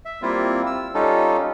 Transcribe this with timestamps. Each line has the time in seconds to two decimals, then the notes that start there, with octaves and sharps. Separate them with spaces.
0.05 E5
0.22 G3 A#3 C4 E4 F4
0.66 E6
0.94 G3 C#4 D#4 F4 A4